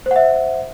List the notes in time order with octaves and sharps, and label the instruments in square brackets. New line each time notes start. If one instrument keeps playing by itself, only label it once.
[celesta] C5
F#5
E5